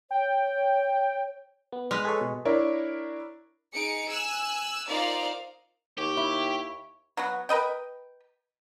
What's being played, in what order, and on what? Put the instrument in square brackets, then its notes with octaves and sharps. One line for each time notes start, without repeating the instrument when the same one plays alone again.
[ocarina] C#5 [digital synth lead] G5
[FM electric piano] B3
[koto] G#3 B4 [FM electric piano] F6
[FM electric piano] G#4 A4 C#5
B2
[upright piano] D4 E4 A#4 C#5
[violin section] D#4 G#4 C#7 D7
G#5 E6 F#6
D#4 F4 A#4 C5 D5 F5
[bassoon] D#2 [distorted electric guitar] G4 [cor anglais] C#5
[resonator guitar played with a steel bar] E4
[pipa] F#3 B3 F#4
A#4 B4 D#5 G5